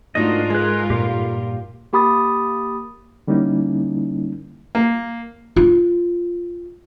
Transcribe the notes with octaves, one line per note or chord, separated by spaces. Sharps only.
G#2 A3 D4 D#4 F4 F#4 A#4 D#5
G#3 G#4 A4 B4 F#6
G2 A#2 G4 F5
A#3 G4 B5 D#6 A6
D3 G3 A#3 C#4 D#4 E4
A#3
F4